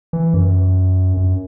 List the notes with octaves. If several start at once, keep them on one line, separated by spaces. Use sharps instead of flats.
E3
F#2
F#2